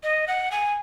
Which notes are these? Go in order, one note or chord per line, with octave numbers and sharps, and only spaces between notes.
D#5
F#5
G#5